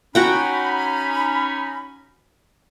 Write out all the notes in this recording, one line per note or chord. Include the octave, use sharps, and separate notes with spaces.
C#4 D#4 F#4 F#5 G5 B5